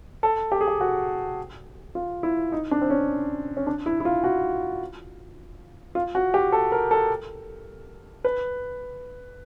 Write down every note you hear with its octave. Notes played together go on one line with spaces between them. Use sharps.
A4
G4
G#4
G4
F#4
F4
E4
D#4
D4
C4
C#4
C#4
D4
E4
E4
F4
F#4
F4
F#4
G4
A4
A#4
A4
B4